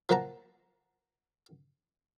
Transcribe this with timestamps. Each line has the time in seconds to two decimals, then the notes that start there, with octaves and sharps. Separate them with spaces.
0.09 F3 A#3 F#5 A5 A#5